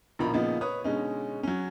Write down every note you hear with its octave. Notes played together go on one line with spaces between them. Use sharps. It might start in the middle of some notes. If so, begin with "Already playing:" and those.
A#1 B2 D#3 F3 A#5 B5
A#2 C#3 F3 A#3 B3 D#4
B4 C#5 D#6
B2 D3 G#3 C#4 D#4
F#3 C#4